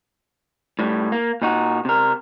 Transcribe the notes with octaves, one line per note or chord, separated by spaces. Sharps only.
A2 G3
A#3
A#2 D#4 F#4
C3 A#4